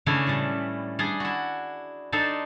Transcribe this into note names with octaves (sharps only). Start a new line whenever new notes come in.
C#3 E3 A3 C#4 D4 E4
A2 G3
G3 D4 G#4
E4 F#4
D4 D#4 A4 C5